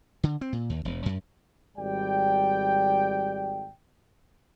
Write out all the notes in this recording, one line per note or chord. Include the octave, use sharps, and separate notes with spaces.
D3
C4
A#2
D#2
E1
F#2
G#1 G3 D5 G5